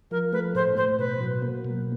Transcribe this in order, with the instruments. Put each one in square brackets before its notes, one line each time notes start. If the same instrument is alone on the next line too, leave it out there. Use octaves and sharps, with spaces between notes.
[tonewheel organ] F3 [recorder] A#4
[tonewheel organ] A3 [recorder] B4
[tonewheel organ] A2 [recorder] C5
[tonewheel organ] A2 [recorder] C5
[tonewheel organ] B2 [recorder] B4
[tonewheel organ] F#3
A#3
B2